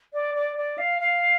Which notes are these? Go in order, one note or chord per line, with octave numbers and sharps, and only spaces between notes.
D5
D5
D5
F5
F5